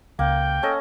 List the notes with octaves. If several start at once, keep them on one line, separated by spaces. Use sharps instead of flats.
C#2 A#3 G5
C#4 A4 D#5